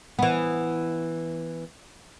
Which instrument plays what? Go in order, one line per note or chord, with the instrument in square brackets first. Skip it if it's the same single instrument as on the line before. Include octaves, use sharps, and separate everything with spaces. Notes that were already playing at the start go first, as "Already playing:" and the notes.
[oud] E3 B3